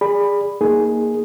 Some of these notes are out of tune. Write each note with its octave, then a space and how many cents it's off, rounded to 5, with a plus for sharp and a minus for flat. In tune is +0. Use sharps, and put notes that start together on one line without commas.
G#4 -30 D5 +0 B5 +0
A#3 +0 D#4 +5 G#4 +0